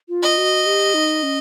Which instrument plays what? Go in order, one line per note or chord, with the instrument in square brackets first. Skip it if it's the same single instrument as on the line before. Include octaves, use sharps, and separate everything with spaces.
[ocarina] F4
[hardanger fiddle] D#5
[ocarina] F#4
G4
D#4
C#4